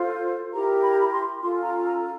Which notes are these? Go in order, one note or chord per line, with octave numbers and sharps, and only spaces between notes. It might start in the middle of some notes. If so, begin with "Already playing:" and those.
Already playing: F4 A4 C5
E4 G4 A#4 A#5
B5
A#5
B5
C6
C#4 F4 A4 C6
A#5
A#5